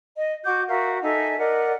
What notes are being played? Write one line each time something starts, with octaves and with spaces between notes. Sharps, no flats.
D#5
F#4 D6 G6
F#4 A#4 E5 F5
D#4 A4 E5 G#5
A#4 D5 D#5 F#5